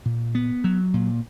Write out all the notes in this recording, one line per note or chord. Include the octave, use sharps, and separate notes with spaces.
A#2
B3
F#3
A#2